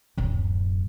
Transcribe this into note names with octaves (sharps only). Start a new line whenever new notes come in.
D1 F#2